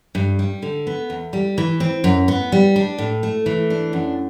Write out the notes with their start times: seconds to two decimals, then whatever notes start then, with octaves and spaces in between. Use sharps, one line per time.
0.15 G2
0.39 G3
0.62 D3
0.87 B3
1.10 E2
1.33 G3
1.58 E3
1.80 C4
2.04 F#2
2.28 B3
2.52 G3
2.76 D4
2.98 A2
3.23 A3
3.46 E3
3.70 D4
3.93 F#2